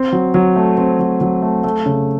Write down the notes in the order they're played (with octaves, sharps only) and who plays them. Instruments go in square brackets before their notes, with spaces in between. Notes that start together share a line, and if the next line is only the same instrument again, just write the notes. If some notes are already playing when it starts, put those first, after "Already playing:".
Already playing: [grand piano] C4
F#3
F#3
A3
C4
F#3
F#3
A3
A3
C#3